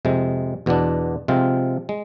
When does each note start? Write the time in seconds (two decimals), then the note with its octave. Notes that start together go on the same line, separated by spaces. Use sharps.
0.05 F2 C3 G#3
0.66 E2 B2 B3 D4
1.28 C3 F3 G#3 C4 F4
1.89 G#3